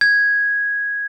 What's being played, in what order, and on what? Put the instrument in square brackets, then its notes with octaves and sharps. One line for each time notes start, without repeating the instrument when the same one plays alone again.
[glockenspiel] G#6